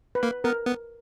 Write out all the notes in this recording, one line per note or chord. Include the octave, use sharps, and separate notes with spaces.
B4
A#3
B3 A#4
B3